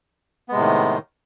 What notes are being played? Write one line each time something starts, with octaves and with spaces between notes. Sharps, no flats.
A2 C3 D#3 G#3 B3